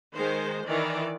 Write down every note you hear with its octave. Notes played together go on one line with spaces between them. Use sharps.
D#3 G#3 C5
D#3 E3 D5